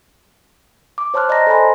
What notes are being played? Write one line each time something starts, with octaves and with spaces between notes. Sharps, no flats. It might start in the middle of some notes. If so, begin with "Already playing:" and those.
D6
C5 C#5 A5 C6 F6 F#6
D5 D#5 A5 A#5 A#6
A4 C5 G#5 B5 C6